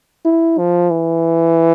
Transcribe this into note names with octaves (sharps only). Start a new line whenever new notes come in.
E4
F3
E3